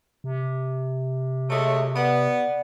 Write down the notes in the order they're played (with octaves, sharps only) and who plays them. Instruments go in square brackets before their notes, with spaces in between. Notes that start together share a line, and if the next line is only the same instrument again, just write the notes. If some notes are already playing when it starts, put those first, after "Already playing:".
[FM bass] C3
[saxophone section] F#3 G#3 A3 [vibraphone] C#5 D#6
[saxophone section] B3 [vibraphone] D5 F#5